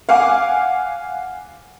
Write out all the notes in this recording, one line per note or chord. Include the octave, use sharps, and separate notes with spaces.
F5 F#5 G#5 D6